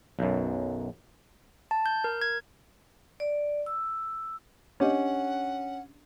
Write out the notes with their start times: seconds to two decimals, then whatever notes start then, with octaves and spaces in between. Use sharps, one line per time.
0.19 B1 F#2
1.71 A5
1.86 G6
2.04 A#4
2.21 G#6
3.20 D5
3.66 E6
4.80 C#4 D4 G4 D#5 F#5